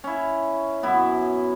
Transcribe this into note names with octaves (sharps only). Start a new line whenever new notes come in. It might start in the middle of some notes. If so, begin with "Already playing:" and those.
C#4 E4
F#2 B3 E4